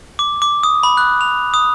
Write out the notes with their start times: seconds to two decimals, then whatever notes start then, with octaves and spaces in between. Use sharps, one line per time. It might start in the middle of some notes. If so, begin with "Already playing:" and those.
0.19 D6
0.42 D6
0.63 D#6
0.83 B5
0.97 F#6
1.21 F7
1.54 D#6